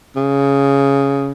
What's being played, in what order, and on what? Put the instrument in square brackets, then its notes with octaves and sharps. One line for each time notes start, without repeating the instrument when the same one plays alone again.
[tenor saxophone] C#3